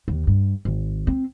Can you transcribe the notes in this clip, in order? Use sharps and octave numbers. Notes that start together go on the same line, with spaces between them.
D#2
G2
G#1
C4